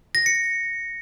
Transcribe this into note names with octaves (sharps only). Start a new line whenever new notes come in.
A#6
C#7